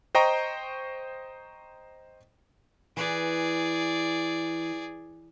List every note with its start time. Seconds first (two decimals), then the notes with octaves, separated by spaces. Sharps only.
0.15 C5 D#5 G5 A#5 C#6
2.97 E3 G#4 D5